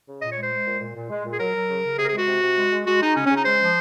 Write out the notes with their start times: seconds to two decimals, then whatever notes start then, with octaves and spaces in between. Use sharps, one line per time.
0.08 C#3
0.22 A#2 D#5
0.32 C#5
0.37 G#3
0.43 C5
0.52 G#3
0.67 A#2
0.81 A#2
0.96 A#2
1.10 G#3
1.25 A#2
1.32 G#4
1.40 F#3 A#4
1.55 F#3
1.69 C#3
1.85 C#3
1.98 C3 G#4
2.04 A#4
2.09 G#4
2.13 G#3 F#4
2.28 C3
2.43 C3
2.57 G#3
2.72 G#3
2.87 G#3 F#4
3.01 G#3 D#4
3.16 C#3 C#4
3.26 C#4
3.31 C#3 D#4
3.45 G#3 C5
3.61 F3